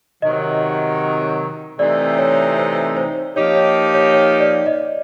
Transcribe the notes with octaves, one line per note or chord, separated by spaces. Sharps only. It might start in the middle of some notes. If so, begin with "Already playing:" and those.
C3 D#3 F#3 D#5
C3 E3 A3 C4 D#4 D5
C#5
C5
C5
F3 A#3 D#4 G4 C#5
C#5
C#5
C#5
D5
D#5